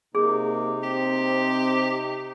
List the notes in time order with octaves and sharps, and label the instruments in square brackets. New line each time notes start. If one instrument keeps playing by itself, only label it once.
[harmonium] C3 D#4 [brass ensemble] A#3 [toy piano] G#4
[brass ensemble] C4 [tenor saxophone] G4